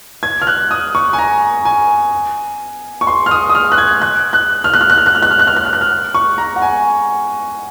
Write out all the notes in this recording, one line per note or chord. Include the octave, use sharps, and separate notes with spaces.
G#6
F6
F#6
D#6
C#6
G#5
A#5
G#5
C#6
C6
F6
D#6
D#6
F6
F#6
G#6
F#6
F#6
F6
F#6
F6
F#6
F6
F#6
F6
F#6
F6
F#6
F6
F#6
F6
F#6
F6
C#6
A#5
F#5
G#5